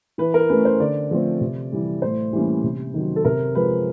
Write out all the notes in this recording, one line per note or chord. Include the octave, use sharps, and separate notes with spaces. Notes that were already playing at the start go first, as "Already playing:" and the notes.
E3 B4
A#4
A3 C#4 B4
C5
D3 D5
F3 A3 C4
C3
E3 G3
A2 C5
E3 G3 A#3 C#4
C3
D#3 F#3
A4
C3 A#4
F3 G#3 B4